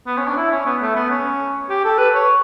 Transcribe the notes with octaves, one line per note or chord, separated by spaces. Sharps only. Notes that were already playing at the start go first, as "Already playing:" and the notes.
B3
C#4
D4
E4
C#4
B3
A3
B3
C#4
G4
A4
B4
C#5